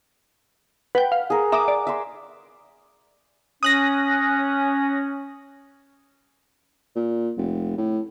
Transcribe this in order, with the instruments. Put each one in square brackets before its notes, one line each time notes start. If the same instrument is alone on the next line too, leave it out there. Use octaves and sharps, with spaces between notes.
[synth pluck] B4 G5 [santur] F#5
[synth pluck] F5
[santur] G#4 A#4
[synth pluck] E5 A#5 D#6 [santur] D6
[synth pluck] D5
[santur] E5 C6
[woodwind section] C#4 [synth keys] D#6 F#6 A#6
[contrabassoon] A#2
F1
A2